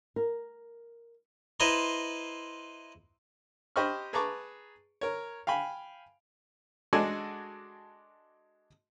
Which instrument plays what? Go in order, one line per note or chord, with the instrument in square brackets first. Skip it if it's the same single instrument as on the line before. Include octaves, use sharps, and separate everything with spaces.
[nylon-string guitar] A#4
[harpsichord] E4 B4 C5 D#5 A#5 C6
[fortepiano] G4 C5 D#5 B5 C#6 F6
G#4 B4 A5 A#5 C#6 D6
A#4 C#5
F5 G5 G#5 B5
G#3 D4 F#4 A4 D5 G#5